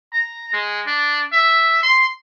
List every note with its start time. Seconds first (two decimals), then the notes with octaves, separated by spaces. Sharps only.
0.13 A#5
0.53 G#3
0.87 D4
1.32 E5
1.83 C6